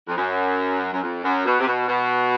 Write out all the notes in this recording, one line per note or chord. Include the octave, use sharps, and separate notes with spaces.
F2
F#2
F#2
F2
F#2
B2
C3
B2
B2